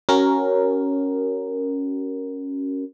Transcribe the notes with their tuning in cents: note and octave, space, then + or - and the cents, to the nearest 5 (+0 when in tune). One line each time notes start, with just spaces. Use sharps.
C#4 +0 F#4 +30 A#4 +0